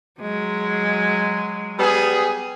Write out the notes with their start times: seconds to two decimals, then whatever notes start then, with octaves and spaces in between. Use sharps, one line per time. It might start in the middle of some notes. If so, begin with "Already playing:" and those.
0.21 F#3 G#3
1.79 G3 B3 G#4